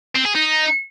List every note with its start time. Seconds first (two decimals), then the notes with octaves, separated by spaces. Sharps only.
0.15 C4
0.25 G#4
0.35 D#4